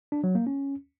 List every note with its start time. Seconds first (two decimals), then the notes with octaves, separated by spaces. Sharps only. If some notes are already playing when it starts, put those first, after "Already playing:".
0.12 D4
0.24 F#3
0.35 A#3
0.47 C#4